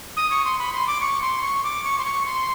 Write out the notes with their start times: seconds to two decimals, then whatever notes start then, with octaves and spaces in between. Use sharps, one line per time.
0.17 D#6
0.31 C#6
0.45 C6
0.59 B5
0.73 C6
0.87 D6
1.01 C#6
1.21 C6
1.42 C#6
1.63 D6
1.84 C#6
1.98 C6
2.05 C#6
2.26 C6